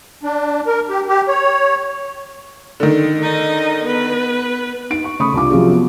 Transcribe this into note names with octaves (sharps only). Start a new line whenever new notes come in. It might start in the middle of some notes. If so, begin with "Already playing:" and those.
D4
A#4
G4
G4
C#5
D3 D#3
D#4 D#5
B3 B4
D#4 D7
C#6
C#3 A3 B5 C#6 D#6
C2 D4 F4 D6
C3 F3 F#3 C#4 F4 G#4
B3